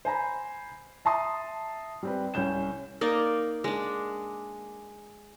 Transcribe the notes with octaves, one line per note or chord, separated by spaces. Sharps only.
C5 G#5 A#5 B5
E5 A5 A#5 C6 D#6
G3 C4 B4
C2 C#4 G6 E7
A#3 D#4 D5
G#3 D4